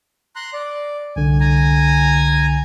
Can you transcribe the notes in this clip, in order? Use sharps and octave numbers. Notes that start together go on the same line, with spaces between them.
A#5 C6 F#6
D5
C2 D3 G#5
G#5 A#5